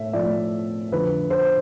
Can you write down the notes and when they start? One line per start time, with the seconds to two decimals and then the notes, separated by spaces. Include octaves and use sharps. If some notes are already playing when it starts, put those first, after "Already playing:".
Already playing: A2 A3 E5
0.13 A2 F3 A3 D5
0.92 F2 D3 F3 B4
1.30 C5